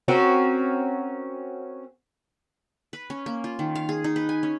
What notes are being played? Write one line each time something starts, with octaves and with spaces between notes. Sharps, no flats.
C4 C#4 F#4 A#4
B4
C#4
A#3
F4
D#3
F5
G#4
D#4
B4
G#5
C#4